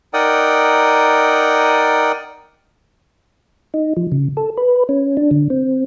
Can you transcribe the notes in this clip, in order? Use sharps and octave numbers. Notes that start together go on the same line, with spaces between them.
D#4 A#4 D5 F#5 G5 D#6
D#4
F3
C#3
A4
B4
C#4
D4
D3
C4